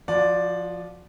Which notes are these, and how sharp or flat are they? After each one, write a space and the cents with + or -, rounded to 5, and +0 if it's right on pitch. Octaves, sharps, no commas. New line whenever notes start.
F3 +0 F#4 -30 D5 +0